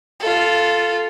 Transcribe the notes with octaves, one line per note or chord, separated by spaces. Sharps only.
F4 A4